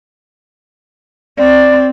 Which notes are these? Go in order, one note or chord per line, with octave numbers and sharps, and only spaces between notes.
C4 D5